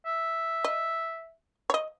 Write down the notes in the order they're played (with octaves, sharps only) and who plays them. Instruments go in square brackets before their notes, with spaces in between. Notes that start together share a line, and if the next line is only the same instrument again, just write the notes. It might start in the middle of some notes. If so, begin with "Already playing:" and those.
[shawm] E5
[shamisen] D#5
C#5 D#5